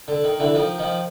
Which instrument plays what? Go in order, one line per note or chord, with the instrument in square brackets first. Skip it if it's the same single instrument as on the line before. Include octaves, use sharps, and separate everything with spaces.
[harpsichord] D3
D#3
D3 E3
D#3 F3
D#3 F3